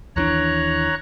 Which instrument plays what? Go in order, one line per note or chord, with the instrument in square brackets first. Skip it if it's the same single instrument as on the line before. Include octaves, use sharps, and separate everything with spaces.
[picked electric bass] D#2 E3 D4 [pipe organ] C#5 A#5 F#6